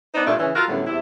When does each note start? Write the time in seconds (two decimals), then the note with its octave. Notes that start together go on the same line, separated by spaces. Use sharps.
0.15 B3 D4 D#4 C5 D5
0.26 G2 A#2 A3 D4
0.39 C#3 E3 C#4
0.54 F4 F#4 A4 A#4
0.68 F#2 A2 D3 G3 B3
0.86 E2 C3 E4